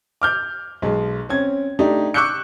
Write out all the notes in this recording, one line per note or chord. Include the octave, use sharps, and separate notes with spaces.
D6 F6 G6
B1 G#3
C4 C#4 G#6
A3 D4 D#4 G4
C#6 D6 E6 F#6 G6 C#7